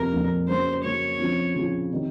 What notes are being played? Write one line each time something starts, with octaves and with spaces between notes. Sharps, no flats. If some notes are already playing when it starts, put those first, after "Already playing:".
Already playing: F2 C3 F3 A#3 A#4
F2 C3 F3 A#3
C#3 F#3 A#3 C#4 C5
C#3 F#3 A#3 C#4 C#5
C#3 F3 C4 F4
C#3 F3 C4 F4
C3 D#3